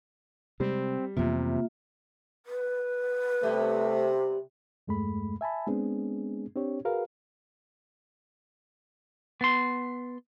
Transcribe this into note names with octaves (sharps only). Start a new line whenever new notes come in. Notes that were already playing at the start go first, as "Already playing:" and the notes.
C3 G3 G#3 C4
F2 C3 E3 A#3 B3 F4 E5
B4
C3 G3 A3 B3
E2 G2 G#3 A3 B5
E5 G#5 A5 B5
G#3 B3 C4 D4 G#4
C4 D4 G4 C#5
F#4 G#4 A#4 B4 F5
B3 C6